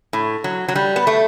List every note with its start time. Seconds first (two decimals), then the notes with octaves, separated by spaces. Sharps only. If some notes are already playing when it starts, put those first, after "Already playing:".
0.13 A2
0.44 F#3
0.68 F#3
0.76 G3
0.96 B3
1.07 A3